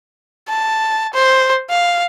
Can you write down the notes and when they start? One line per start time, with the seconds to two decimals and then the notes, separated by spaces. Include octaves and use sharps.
0.49 A5
1.14 C5
1.70 F5